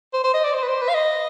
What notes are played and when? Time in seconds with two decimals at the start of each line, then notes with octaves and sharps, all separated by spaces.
0.13 C5
0.24 C5
0.34 D#5
0.44 D5
0.54 C5
0.62 B4
0.68 C5
0.81 B4
0.89 F5
0.94 D#5